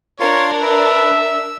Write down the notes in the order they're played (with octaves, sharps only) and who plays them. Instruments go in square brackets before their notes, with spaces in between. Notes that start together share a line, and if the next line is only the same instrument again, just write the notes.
[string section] D4 A#4 [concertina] F4 C6 [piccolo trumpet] C#5
[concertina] B4 [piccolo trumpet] E5
[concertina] E6